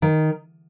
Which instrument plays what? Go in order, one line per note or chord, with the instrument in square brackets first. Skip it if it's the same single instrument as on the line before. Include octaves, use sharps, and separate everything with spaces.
[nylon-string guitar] D#3